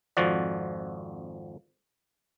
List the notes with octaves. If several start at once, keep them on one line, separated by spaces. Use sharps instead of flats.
G#1 F2 F3 F#4 D5